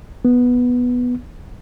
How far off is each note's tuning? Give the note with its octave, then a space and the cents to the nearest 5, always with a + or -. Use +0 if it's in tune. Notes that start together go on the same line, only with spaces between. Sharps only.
B3 -5